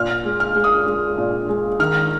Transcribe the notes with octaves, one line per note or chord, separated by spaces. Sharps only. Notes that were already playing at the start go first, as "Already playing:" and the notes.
Already playing: A#2 F6
G#3
F6
G#3
D#6
G#3
A#2
G#3
D#3 F6